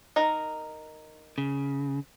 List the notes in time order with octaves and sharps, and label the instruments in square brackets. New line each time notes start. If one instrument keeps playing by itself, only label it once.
[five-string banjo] D#4 A#4 A#5
[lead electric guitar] C#3